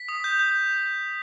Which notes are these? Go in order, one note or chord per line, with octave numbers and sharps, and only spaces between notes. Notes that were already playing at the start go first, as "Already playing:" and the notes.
Already playing: B6
D#6
G6
G6